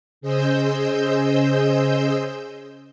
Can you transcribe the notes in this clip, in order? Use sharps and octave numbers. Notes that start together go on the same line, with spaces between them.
C#3 G#4 C5 D#5 E6 G6